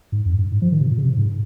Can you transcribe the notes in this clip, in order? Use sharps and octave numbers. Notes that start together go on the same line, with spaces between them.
G#2
F2
G2
G#2
F3
D#3
C3
A#2
C#3
C3
G#2